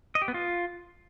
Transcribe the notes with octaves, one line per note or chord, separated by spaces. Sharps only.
D#5
G4
B3
F4